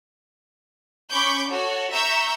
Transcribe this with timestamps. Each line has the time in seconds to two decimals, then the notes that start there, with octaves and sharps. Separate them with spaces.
1.11 C#4 B5 C#6 D6 G6
1.49 F#4 A4 C#5
1.91 E5 A#5 C#6 E6 G6